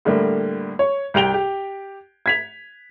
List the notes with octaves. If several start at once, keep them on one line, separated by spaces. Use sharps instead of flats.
A2 D3 G3 A#3
C#5
C2 G4 D7 F7 G7
G4
G#6 B6 F7